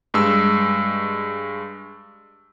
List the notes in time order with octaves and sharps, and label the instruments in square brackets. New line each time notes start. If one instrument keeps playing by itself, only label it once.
[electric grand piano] G2 G#3 E6